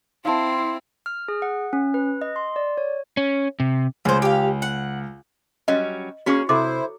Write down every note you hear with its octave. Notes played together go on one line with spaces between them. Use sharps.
C4 E4 F5 A5 C6
F6
G#4
F#5
C#4
B4
D#5
C6
D5
C#5
C#4
C3
C#2 C#3 C5
G4 F5
F#5
F#3 G3 C#4 D#5
A#3 C#4 F#4 G#4 C#6
C3 E4 A4 C5 D6